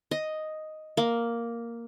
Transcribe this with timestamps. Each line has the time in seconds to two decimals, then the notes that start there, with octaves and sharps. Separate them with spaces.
0.11 D#5
0.97 A#3